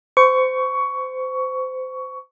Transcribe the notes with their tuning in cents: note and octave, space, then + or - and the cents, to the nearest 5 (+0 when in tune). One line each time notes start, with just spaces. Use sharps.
C5 -25 C#6 +15